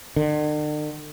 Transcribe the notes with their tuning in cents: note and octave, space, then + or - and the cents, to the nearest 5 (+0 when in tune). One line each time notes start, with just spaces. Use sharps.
D3 +45